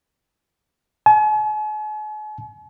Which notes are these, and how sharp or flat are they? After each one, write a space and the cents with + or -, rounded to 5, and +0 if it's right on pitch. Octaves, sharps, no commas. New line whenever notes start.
G#5 +45